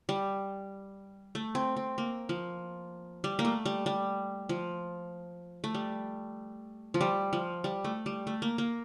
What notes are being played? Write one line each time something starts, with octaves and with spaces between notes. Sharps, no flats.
G3
A3
C4
C4
A#3
F3
G3
A#3
A3
G3
G3
F3
A3
G3
F3
G3
F3
G3
A3
G3
A3
A#3
A#3